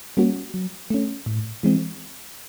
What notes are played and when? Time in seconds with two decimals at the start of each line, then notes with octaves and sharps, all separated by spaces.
0.17 G3 A#3 C#4 F#4
0.54 F#3
0.90 A3 C#4
1.26 A2
1.63 E3 G#3 C4